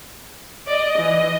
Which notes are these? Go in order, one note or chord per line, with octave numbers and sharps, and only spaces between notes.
D5 D#5
E3